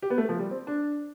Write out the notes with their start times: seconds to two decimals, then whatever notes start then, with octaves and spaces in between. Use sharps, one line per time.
0.02 G4
0.10 B3
0.18 A3
0.29 F3
0.39 G3
0.51 C4
0.67 D4